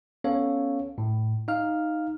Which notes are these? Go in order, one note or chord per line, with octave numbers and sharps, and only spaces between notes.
B3 C#4 A4 C#5 F5
A2
D#4 F5 F6